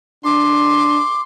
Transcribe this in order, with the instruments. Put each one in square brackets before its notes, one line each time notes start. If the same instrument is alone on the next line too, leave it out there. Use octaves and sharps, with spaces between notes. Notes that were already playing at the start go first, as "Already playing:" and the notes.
[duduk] D4 [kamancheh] C6 [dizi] D6